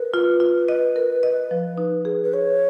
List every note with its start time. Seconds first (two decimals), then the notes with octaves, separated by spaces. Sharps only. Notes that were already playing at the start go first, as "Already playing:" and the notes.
Already playing: A#4 B4
0.14 F4
0.40 F4
0.68 D#5
0.96 A#4
1.23 D#5
1.51 F3
1.78 D#4
2.05 G#4
2.24 B4
2.33 G#4 C#5